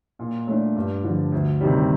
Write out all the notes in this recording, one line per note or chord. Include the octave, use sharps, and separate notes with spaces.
A#2
A3 D4
G2
D3 F3
D2
C3 D#3 G3